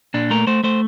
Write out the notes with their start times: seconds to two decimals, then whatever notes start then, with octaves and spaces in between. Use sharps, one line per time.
0.14 A#2 D4
0.30 A3 A#4
0.47 A3 C5
0.64 A3 C5